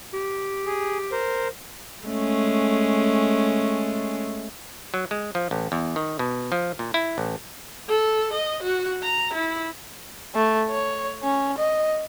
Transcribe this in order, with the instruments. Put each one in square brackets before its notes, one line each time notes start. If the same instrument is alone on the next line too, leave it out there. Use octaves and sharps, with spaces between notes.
[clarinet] G4
[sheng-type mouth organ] G#4
A#4 C5
[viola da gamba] G#3 A3 C#4
[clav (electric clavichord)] F#3
G#3
F3
A1
E2
D#3
B2
F3
A#2
E4
A1
[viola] A4
D#5
F#4
A#5
E4
[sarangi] A3
C#5
C#4
D#5